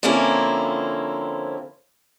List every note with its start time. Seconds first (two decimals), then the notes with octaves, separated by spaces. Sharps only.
0.03 D3 F3 A#3 C4 C#4 E4